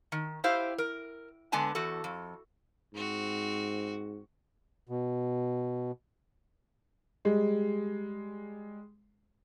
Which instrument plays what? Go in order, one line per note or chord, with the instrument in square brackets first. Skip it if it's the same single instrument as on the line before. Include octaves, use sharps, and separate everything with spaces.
[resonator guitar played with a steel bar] D#3
E4 G4 C5 F5
A#4
D3 G#3 B3 D4 G#5 A5
E2 F#4 A4
F2
[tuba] G#2 [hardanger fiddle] C4 F#4
[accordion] B2
[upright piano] G3 G#3